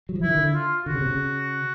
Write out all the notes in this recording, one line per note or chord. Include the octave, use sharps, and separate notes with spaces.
F#3
F3
E3 E4
D#3
D3
F4
D3 F#4
C#3
C3
C#3